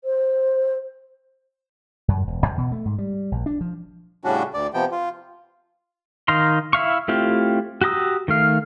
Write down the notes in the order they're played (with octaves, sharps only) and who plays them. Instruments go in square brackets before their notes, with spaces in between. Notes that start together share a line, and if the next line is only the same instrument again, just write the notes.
[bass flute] C5
[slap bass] F#2
E1
E2
B2
A3
G#2
G3
A#1
D4
F3
[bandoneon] A2 C#3 G3 C#4 D4 F#4
D2 D5
C3 F3 B3 G5
F4
[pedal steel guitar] D#3 D#4 F5 A#5 C6
E4 E5 F5 C#6
A3 C4 E4 F4 G4
F#4 G4 A#5 D#6 E6
D#3 A3 F5